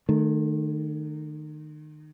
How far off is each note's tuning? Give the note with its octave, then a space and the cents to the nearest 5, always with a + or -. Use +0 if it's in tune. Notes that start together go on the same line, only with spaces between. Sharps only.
D#3 -30 A3 +0